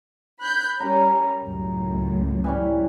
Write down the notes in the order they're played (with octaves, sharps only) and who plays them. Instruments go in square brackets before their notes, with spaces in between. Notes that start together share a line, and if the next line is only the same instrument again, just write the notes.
[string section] B5 F#6 G6
[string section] G3 C#4 [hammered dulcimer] A#4 G5 A#5
[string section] C#2 F#2 A2
[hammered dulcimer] E3 G3 C#4